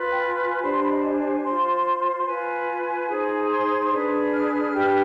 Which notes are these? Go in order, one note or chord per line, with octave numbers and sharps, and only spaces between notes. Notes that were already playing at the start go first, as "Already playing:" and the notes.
Already playing: F4 B4
G5
G#5
D4 G4 C5 B5
C6
B5
D#5
G#5
F4 C5 C6
B5
F4 B4 G#5
D#4 G#4 C5
C6
D4 G#4 B4
F6
D4 G4 B4